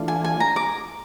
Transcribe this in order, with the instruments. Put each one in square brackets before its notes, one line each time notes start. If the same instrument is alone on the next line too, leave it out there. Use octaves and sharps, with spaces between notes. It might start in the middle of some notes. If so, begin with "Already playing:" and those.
Already playing: [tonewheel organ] E3 A3 D4 F4
[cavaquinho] G#5
G#5
A#5
D6